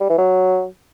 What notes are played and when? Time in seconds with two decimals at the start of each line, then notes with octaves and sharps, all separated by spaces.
0.01 G3
0.09 E3
0.18 F#3